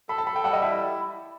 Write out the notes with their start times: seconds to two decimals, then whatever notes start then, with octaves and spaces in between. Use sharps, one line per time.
0.09 A4 B5
0.18 A5
0.27 A4 B5
0.36 G5
0.44 G3 F#5
0.53 D#5
0.62 E4 E5